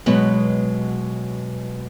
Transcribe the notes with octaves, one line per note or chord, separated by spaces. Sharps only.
B2 F#3 G#3 B3 B4